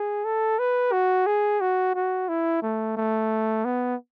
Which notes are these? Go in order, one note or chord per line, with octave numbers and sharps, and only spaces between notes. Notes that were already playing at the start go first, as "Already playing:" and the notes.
Already playing: G#4
A4
B4
F#4
G#4
F#4
F#4
E4
A3
A3
B3